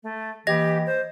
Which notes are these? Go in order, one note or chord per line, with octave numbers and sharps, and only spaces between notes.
A3
E3 A#3 G4 D#5 A#6
C5